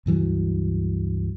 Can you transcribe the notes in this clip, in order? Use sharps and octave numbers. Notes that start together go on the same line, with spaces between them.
C#2 G2 E3 F#3